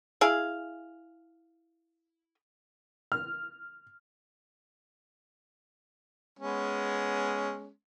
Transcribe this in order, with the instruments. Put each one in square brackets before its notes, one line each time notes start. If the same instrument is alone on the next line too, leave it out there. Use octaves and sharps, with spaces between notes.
[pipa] E4 G#4 F5
[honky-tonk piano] F6
[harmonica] G#3 B3 C#4